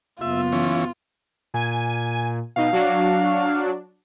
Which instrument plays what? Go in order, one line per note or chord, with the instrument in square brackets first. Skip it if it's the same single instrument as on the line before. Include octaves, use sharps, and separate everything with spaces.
[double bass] F#1 B3 [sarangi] F4 [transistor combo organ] E5
[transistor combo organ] E3 C#4
[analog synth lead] A#2 [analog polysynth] G#5
[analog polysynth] B2 D#4 [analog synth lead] F5
[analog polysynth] F#3 D4 F#4